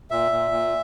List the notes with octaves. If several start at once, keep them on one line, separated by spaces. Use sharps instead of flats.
A#2 E5
A#2
A#2